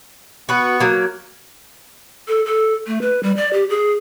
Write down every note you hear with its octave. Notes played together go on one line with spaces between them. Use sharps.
B3 F#4 B4 C#6
F#3 A#3
A4
A4
A3
B4
G3
D5
G4
G#4